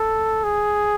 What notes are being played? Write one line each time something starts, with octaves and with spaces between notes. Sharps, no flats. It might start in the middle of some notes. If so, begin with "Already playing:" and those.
Already playing: A4
G#4